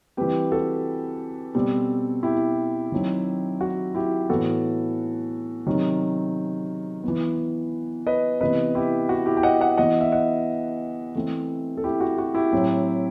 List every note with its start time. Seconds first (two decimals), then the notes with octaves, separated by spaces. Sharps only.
0.17 E3 G3 C4 G4 B4
0.52 F#4 A4
1.55 B2 G3 C4
2.23 E4 G4
2.92 D#3 F#3 C4
3.61 F#4
3.95 E4 G4
4.29 A2 E3 B3 F#4 A4
5.67 C3 D#3 F#3
7.04 E3 B3
8.07 B4 D#5
8.41 C3 E3 B3 B4 D#5
8.75 E4 G4
9.09 F#4
9.26 E4 G4
9.37 G5
9.43 D#5 F#5
9.61 D#5 F#5
9.78 E3 B3 D#5 F#5
10.01 E5
10.12 D#5 F#5
11.15 E3 A3 C4
11.77 A4
11.84 E4 G4
12.00 F#4
12.18 F#4
12.35 E4 G4
12.53 A2 F#3 C4